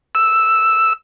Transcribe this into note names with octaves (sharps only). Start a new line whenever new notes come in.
E6